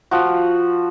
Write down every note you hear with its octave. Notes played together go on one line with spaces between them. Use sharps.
F3 F#4